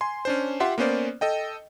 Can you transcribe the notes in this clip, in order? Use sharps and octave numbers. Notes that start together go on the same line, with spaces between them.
G#5 C6
C#4 D4 C5
F4 G4 E5 F#5 C6
A#3 B3 C#4 C5 D5
A4 D#5 G5